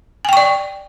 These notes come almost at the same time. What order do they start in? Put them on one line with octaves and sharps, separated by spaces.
G#5 G5 C#6 D5